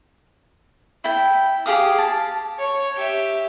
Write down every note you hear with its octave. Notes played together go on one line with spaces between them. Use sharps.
E4 G5
G4 G#4 F5 D#6
A5
C#5
G4 E5